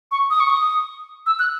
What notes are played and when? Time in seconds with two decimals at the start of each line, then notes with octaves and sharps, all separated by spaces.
0.11 C#6
0.30 D#6
0.40 C#6
0.50 D#6
1.26 E6
1.39 F#6